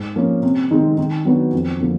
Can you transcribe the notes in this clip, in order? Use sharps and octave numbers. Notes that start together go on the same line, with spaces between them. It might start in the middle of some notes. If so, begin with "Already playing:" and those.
Already playing: G#2
F3 A#3 C#4
C3
D#3 G#3 C4 D#4
D#3
F#3 B3 D4 F#4
F2
D3 F3 A#3